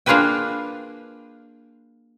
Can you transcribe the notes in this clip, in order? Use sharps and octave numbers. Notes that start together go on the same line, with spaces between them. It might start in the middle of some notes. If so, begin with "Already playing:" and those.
A#3 D4 F4 G#4 B4 G5